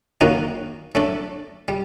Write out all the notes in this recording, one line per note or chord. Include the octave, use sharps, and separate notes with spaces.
D#3 F#3 A#3 D#4 F#4
F#3 A3 D4 A4
G3